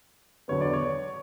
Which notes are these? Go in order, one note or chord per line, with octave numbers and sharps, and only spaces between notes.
E2 D3 F#3 B3 C#5
D5
C#5